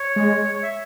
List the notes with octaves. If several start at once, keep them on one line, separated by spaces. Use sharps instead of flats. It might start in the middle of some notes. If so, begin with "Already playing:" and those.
Already playing: C#5
G#3
C#5
C#5
E5